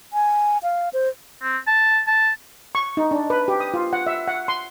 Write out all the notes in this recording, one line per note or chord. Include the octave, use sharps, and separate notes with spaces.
G#5
F5
C5
C4
A5
A5
C#6
D#4
D4
B4
G4
D#6
F4
F#5
E5
F#5
C6